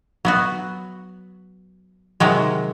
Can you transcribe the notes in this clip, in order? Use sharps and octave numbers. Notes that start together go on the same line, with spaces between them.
F#3 B3 F#4
C3 D#3 F#3 G#3